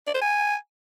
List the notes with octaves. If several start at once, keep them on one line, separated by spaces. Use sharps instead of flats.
D5
C5
G#5